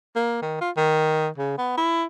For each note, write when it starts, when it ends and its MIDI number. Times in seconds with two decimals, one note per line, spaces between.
0.16 0.38 58
0.42 0.60 51
0.61 0.71 65
0.77 1.28 51
1.38 1.57 49
1.58 1.73 59
1.77 2.04 64